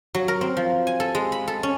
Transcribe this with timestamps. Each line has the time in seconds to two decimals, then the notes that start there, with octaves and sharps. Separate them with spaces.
0.15 F#3
0.28 A#4
0.41 C4
0.57 F3
0.87 G#5
1.00 A4
1.15 G#3
1.32 B5
1.48 A4
1.63 C#4